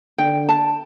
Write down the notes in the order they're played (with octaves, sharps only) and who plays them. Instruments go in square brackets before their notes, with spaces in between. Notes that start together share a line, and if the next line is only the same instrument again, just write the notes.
[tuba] D3 [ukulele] G5
[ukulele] A5